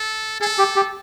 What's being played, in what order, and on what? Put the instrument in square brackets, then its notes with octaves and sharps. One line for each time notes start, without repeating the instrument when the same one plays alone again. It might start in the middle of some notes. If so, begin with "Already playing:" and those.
Already playing: [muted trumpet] A4
[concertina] G#4 [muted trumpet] A4
[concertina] G4
G4